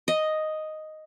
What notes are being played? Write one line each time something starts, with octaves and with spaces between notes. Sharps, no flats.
D#5